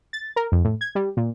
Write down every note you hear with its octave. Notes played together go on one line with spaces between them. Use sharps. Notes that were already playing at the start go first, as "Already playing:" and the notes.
A6
A#4
F2
A2
G#6
G3
A#2